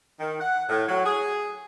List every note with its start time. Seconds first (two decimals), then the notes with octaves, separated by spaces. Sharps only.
0.20 D#3
0.40 F#5
0.69 A2
0.88 F#3
1.04 G#4